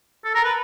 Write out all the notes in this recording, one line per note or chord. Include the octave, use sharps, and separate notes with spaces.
A4
A#4
B4